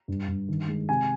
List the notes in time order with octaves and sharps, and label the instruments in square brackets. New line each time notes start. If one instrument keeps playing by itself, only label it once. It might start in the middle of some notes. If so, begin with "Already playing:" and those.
[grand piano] G2
G2
D#3
G#3
C3 G#5